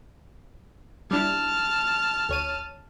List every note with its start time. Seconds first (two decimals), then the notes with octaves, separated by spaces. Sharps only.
1.11 G3 D4 E4 A5 F6
2.29 D2 C#5 D#7